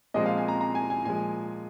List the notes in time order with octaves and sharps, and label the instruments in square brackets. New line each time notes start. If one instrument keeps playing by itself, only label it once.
[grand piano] A#2 F3 G#3 C4 D#5
F5
G#5
A#5
A#5
G#5
G#5
A#2 F3 G#3 G#5